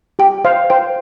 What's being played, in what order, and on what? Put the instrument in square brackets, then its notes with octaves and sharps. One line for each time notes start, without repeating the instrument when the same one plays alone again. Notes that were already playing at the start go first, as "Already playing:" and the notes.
[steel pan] G4 [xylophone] G5
[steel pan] C5 F5
[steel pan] C5 [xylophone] G5